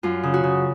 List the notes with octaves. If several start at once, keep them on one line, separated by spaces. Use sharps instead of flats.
F#2 F4
C#3
F#4
C#3